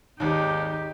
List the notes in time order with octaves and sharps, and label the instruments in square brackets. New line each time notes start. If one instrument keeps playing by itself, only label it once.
[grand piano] G#1 D#2 [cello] D#4 G4